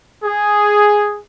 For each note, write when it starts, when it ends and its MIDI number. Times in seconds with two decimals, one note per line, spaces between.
0.24 1.17 68